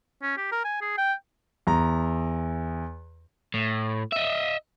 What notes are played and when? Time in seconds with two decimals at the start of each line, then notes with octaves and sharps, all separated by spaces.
0.22 C#4
0.37 G4
0.52 A#4
0.64 G#5
0.81 G#4
0.97 G5
1.67 E2 A#5
3.54 A2
4.13 D#5 E5